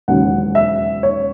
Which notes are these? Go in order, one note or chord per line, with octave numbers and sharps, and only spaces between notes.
E1 D#2 C#3 F#3 F#5
E5
C#5